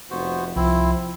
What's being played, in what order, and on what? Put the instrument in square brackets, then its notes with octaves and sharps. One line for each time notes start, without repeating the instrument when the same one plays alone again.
[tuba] F1 [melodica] B3 F#4 C5
[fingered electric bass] C2 [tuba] F3 [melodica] C4 E4